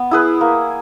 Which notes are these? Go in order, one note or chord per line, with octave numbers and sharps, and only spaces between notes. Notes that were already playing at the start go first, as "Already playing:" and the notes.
Already playing: B3
E4 G#4 B4
A#3